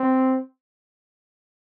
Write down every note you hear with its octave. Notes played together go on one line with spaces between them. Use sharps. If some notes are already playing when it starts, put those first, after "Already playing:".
Already playing: C4